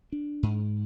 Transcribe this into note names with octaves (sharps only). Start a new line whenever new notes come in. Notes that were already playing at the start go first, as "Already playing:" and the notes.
D4
G#2